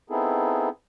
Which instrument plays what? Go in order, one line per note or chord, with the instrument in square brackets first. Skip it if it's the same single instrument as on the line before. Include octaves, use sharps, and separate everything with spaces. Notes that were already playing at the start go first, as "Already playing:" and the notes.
[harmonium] B3 C4 D#4 E4 G#4 A4